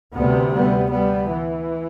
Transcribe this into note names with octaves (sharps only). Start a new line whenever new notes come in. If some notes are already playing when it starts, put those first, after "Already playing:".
D2 C3 G3 B3
G3 B3
G3 B3
E3